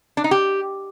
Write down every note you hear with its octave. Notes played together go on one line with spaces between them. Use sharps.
D4
D#4
G4